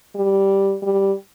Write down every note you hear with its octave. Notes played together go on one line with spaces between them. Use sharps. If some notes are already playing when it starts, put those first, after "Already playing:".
G3
G3